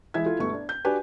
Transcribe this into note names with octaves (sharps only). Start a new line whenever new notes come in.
E3 G#3 E4 E5 G#6
E4 F4 A4
G1 B2 A3 C#6
D4
G6
D4 F#4 G4 B4 G#5